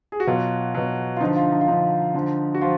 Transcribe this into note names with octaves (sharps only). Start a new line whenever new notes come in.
G#4
F#4
B2 F#3 F4
B2 F#3
F4
D3 F3 D#4
F4
D#4
F4
D3 F3 D#4
D3 F3
F#4
F3 F4